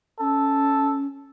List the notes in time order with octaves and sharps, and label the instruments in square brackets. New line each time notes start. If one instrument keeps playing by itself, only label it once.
[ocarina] C#4 [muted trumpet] A4